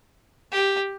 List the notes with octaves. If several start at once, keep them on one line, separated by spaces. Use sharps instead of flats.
G4